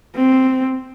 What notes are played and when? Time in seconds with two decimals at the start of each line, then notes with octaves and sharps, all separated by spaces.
0.16 C4